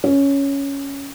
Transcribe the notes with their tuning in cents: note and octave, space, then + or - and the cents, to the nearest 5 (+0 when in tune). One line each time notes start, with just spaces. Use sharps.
C#4 +5